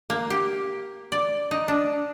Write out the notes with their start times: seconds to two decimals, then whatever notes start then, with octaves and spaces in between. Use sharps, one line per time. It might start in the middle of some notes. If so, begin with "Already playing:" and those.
0.10 A#3
0.30 G4
1.12 D5
1.51 D#4
1.68 D4